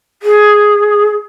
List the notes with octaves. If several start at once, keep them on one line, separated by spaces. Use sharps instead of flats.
G#4